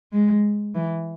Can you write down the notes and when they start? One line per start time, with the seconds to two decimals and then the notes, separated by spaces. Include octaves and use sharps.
0.12 G#3
0.75 E3